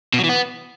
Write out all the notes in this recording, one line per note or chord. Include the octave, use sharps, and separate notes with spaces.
B2
F#3
E3
B3